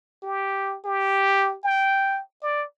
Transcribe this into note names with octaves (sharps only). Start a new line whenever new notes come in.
G4
G4
G5
D5